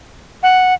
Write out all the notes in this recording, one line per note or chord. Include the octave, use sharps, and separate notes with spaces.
F#5